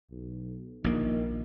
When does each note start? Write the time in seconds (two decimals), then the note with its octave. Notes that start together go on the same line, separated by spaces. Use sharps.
0.11 B1
0.84 A#1 D#3 A#3